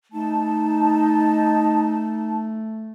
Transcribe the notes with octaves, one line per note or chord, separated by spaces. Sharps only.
A3 D#4 A5